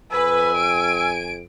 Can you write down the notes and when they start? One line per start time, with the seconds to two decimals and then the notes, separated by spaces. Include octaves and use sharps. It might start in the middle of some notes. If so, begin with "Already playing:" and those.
0.12 F2 B4 G#5 E6
0.57 D7